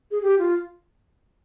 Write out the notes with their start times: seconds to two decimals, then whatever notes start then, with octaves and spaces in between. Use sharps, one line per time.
0.11 G#4
0.22 G4
0.39 F4